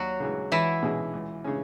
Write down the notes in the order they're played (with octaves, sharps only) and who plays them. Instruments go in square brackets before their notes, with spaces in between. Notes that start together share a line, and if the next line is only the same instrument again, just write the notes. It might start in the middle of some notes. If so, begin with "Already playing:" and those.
Already playing: [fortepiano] D#2 [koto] F#3 F#4
[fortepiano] C#3 E3 G#3
[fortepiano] C#2 [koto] E3 E4
[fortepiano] B2 G#3 C#4 G#4
C#2
C#3 G#3 C#4